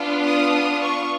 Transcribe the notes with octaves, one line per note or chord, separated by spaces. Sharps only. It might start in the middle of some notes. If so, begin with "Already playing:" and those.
Already playing: B3 D4 F4
D#6
C#6